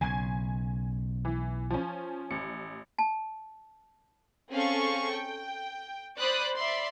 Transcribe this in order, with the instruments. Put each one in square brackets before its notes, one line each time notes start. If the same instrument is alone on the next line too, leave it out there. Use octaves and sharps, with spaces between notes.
[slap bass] B1 C#3 [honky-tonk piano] G#5 G#6
[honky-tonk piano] E3
F3 C#4
A1 C#7
[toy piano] A5
[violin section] C4 C#4 G#4 A4 F5 C#6
G5
C5 D5 B5 D#6 F#6
D5 E5 B5 C6